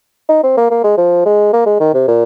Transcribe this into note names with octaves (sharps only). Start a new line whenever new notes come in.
D#4
C4
A#3
A#3
G#3
F3
G#3
A#3
G#3
D#3
C3
A#2